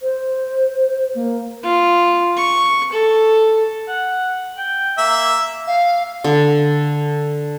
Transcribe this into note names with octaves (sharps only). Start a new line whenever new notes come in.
C5
A#3
F4
C#6
A4
F#5
G5
A#3 E5
F5
D3